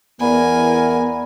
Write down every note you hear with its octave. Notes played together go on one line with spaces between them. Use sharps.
E2 B3 A#4 D5 G#5 B5